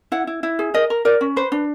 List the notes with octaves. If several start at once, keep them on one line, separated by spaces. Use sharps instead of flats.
E4 F#5
E4
E4
G#4
A#4 D#5
A#4
A#4 D5
C#4
B4 C5
D4